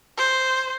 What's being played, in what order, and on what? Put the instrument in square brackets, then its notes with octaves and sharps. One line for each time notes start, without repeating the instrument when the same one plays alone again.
[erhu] C5